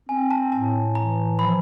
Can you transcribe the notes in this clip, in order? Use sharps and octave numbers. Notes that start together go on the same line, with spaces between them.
C4 G#5
A5
A2 A5
E3 A#5
F3 B5